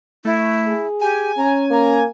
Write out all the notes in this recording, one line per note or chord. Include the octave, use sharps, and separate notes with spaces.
A3 E4
G#4
G4 G#5
C#4 A#5
A#3 A#5